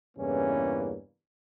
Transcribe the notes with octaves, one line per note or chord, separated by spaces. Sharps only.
E2 G2 C#3 E3 A#3 C#4